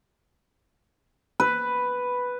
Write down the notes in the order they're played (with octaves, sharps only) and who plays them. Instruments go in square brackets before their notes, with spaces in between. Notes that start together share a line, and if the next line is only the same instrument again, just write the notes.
[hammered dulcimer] B4